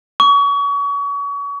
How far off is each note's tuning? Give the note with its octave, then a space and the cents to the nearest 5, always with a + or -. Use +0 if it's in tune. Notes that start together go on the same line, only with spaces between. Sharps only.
C#6 +35